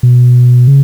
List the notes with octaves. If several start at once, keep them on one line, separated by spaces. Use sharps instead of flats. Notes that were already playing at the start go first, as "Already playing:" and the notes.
B2
C#3